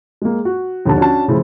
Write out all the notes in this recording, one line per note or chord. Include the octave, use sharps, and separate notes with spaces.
G#3 A#3
F#4
D#2 D3 F3 A5
C#4 D4 F#4 A5
C#3 F3 A3 E4